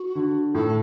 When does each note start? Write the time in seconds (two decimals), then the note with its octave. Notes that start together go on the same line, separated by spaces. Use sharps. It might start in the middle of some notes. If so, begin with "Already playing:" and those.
Already playing: F#4
0.15 D3
0.54 A2 A4